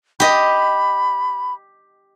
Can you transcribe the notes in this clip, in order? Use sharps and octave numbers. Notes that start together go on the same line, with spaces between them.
G4 D#5 B5